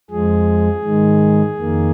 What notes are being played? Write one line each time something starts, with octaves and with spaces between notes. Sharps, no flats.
F2 F3 G#3 G#4
G#2 D#3 G#3
F2 D#3 A#3